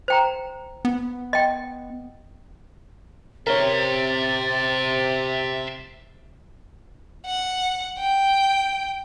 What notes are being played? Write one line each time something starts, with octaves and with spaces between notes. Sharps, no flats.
C5 G5 A#5
B3
D#5 G5
C3 A#4 C#5 E5 C6 A6
F#5
G5